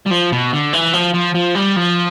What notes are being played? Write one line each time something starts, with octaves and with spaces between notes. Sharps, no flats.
G3
F3
B2
D3
E3
F3
F3
F3
G3
F3